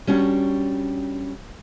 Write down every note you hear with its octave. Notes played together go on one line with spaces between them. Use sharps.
G3 C#4 D4 F#4